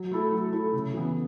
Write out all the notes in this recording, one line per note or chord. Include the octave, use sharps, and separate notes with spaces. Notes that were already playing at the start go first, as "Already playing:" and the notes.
Already playing: F#3
A3 E4 A4
F#3
A3 E4 A4
C#3
E3 B3